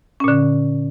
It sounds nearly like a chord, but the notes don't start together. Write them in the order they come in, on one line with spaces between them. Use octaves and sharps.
C#4 A#2 D3